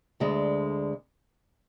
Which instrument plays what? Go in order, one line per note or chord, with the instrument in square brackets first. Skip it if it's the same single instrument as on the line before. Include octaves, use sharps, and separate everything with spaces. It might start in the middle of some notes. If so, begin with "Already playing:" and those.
[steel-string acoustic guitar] D2 D3 G#3